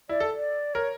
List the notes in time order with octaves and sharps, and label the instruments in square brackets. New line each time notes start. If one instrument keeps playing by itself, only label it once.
[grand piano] E4 [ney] D5
[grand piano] A4
[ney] D5
[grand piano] A#4 [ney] C#5